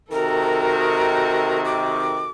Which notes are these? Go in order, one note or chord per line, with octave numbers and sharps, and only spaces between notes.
C3 D#3 F#4 A4 A#4
D6